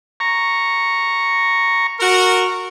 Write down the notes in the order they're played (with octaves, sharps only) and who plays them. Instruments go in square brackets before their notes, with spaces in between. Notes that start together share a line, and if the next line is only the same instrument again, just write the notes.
[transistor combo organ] A#5 C#6
[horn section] F#4 A#4